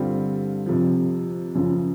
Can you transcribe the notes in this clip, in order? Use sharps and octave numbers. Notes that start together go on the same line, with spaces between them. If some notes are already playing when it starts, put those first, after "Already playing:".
Already playing: G2 D3 G3 C4 F4
F2 C3 F3
F#2 C#3 F3